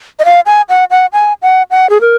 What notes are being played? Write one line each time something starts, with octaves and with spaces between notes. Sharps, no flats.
D#5
F5
G#5
F#5
F#5
G#5
F#5
F#5
G#4
A#4